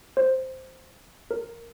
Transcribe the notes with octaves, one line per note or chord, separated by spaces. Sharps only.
C5
A#4